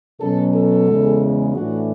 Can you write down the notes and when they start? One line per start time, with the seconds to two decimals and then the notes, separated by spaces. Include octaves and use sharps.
0.20 B2 F#3 C#4 A4
0.53 A4
0.88 E2 C#3 G#3
1.53 A2 E3 A3 D4 F#4